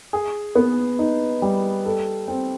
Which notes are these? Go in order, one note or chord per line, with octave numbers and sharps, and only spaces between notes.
G#4
B3
D#4
G3
A4
C4